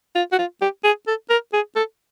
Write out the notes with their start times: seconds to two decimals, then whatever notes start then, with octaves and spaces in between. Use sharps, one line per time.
0.15 F4
0.32 F#4
0.38 F4
0.61 G4
0.84 G#4
1.07 A4
1.30 A#4
1.53 G#4
1.76 A4